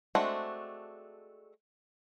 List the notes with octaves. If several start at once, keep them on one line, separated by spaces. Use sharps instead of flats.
G#3 A3 C4 D4 F#4